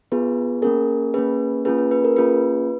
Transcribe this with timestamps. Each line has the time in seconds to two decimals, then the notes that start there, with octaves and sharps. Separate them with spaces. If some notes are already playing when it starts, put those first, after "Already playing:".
0.12 B3 F4 G#4 B4
0.62 A#3 C#4 G#4 A#4
1.14 A#3 C#4 G#4 B4
1.65 A#3 C#4 F4 G#4 B4
1.78 B4
1.91 B4
2.05 A#4
2.16 A#3 C#4 F4 G#4 B4